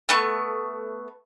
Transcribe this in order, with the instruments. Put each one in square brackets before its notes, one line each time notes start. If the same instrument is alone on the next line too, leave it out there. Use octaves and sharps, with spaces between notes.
[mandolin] A3 B3 C#6